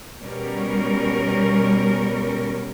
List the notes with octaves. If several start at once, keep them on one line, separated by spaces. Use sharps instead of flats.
B2 G3 C#4 A#4